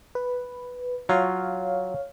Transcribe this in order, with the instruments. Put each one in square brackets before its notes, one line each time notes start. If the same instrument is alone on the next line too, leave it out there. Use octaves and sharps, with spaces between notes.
[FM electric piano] B4
[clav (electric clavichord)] F#3 F4 [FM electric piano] C#5 F5